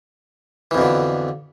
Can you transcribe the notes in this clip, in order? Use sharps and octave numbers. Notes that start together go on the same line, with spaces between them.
F2 B2 D3 E3